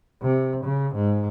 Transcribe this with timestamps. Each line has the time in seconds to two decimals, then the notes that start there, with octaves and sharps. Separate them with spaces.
0.22 C3
0.64 C#3
0.95 G#2